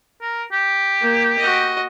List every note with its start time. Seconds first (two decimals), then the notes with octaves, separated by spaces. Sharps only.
0.21 A#4
0.52 G4
1.00 A#3
1.38 F#4 D#5